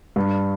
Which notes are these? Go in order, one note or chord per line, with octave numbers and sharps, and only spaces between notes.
G2